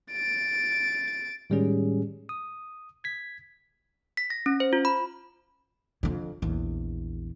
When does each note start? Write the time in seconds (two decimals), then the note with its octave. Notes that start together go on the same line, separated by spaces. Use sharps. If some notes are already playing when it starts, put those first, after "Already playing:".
0.12 A6 D7
1.50 A2 D#3 G3 G#3 C#4 G#4
2.29 D#6
3.04 G#6 B6
4.17 B6
4.30 A#6
4.46 C#4
4.60 C5
4.73 F4
4.85 B5
6.03 F2 D3
6.42 A#1 E2